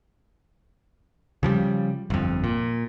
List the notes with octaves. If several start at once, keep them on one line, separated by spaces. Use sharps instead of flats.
C#3 F3 G3
G1 F2
A#2